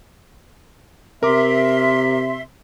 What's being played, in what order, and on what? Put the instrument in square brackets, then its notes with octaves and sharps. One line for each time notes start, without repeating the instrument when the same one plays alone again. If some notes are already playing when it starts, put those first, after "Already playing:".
[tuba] C3 [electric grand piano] A#4 D6 [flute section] E5 C6